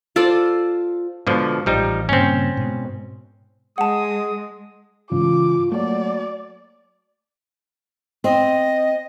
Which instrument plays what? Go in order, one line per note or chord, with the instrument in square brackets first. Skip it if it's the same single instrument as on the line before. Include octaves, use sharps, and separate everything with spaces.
[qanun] F4 A4 C5 D5
[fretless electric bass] G#2 [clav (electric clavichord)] B2 D3 F3
[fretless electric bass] A1 [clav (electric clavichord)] F3 G3 D#4
[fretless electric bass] G2 A#2 C#3 [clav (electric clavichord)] C4 C#4
[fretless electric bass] G#2 B2
[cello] G#3 [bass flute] G#4 [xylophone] F#5 A5 [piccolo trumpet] D#6
[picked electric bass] G#2 C#3 E3 [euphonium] F4 [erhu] D6
[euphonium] F#3 [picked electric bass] A3 A#3 [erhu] D5
[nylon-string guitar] C4 [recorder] D#5